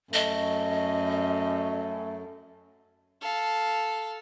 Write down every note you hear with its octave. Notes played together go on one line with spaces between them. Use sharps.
F#2 A3 D#5
A4 F5